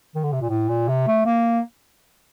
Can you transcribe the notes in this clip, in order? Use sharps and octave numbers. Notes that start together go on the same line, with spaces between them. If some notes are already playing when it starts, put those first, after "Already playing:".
D#3
D3
C3
A#2
A2
A#2
C3
A3
A#3